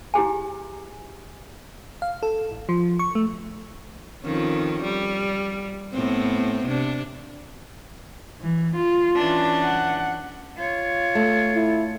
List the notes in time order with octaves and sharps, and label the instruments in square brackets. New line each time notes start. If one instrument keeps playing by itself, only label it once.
[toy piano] E4 G4 G#4 G#5
[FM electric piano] F5
A4
A1
F3
C#6
A3
[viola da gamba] F2 D#3 C#4
G3
A2 B3 C4
C3 D4
[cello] E3
F4
[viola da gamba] E3 C#4 D4
[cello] F#5
F4 C#5
[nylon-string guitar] A3
[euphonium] E4